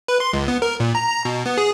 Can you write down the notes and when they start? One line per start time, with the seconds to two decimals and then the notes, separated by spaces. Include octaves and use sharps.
0.08 B4
0.20 C6
0.33 C#2
0.48 B3
0.62 A#4
0.80 A#2
0.95 A#5
1.09 A#5
1.25 B2
1.46 B3
1.58 G#4